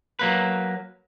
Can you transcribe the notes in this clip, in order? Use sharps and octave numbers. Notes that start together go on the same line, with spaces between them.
F#3 A#3 B4